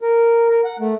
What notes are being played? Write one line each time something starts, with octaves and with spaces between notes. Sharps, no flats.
A#4
A#4
F#5
A3